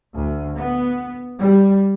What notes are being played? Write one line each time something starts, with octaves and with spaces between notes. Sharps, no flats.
D2
B3
G3